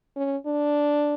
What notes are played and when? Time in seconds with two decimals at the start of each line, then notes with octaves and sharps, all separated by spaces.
0.16 C#4
0.46 D4